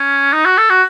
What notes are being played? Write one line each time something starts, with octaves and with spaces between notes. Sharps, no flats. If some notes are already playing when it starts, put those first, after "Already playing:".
Already playing: C#4
D#4
F#4
A4
F#4